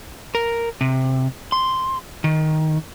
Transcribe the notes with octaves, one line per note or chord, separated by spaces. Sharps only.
A#4
C3
C6
D#3